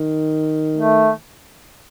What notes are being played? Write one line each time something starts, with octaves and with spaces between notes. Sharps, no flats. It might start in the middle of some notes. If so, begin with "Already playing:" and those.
Already playing: D#3
A3